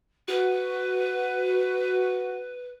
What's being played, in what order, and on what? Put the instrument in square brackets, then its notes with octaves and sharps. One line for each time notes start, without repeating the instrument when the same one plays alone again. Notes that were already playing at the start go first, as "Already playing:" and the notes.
[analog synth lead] F#4 [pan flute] B4